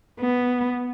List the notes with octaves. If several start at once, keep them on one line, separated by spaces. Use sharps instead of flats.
B3